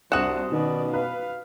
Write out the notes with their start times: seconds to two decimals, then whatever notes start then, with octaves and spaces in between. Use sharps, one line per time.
0.12 C2 D4 F#4 C5 F#5 D#6 E7
0.52 B2 D#3 C#4 D5
0.93 B4 F5